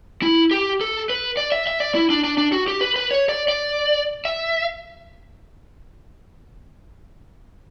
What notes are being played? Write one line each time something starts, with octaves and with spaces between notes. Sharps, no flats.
E4
G4
A4
B4
D5
E5
E5
D5
E4
D4
D4
D4
F#4
G4
B4
B4
C#5
D5
D5
E5